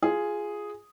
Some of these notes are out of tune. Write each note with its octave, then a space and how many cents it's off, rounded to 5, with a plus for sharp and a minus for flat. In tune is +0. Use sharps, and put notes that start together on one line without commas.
F4 -5 G#4 +0